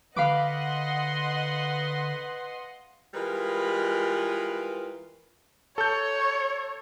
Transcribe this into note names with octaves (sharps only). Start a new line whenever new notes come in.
D3 B4 D#5 F5 F#5 B5 C6 D6
E3 G3 G#3 F4 A#4 B4
A4 C#5 G6